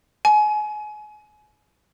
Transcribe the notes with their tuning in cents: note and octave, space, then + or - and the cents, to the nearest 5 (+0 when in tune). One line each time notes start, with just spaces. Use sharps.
G#5 +30